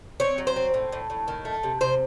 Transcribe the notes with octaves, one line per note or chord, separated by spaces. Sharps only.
C4 C#5
F#3
C5
C4
A2
A2
A2
D#3
A3
C3
C3 C5